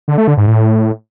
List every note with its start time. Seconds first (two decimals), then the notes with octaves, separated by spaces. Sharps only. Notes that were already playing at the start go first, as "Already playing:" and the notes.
0.08 D3
0.18 A3
0.28 D3
0.37 G#2
0.47 A2